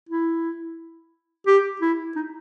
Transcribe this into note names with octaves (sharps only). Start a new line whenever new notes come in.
E4
G4
E4
D#4